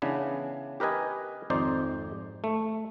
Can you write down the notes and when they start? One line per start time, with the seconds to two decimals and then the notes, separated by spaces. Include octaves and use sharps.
0.02 C#3 E3 B3 D4
0.80 G4 A#4 B4 D#5 G#5
1.50 G#1 F2 D#4 C5 D5
2.44 A3